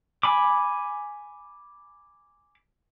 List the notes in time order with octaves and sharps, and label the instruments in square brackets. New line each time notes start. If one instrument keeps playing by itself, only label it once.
[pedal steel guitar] G#5 B5 D6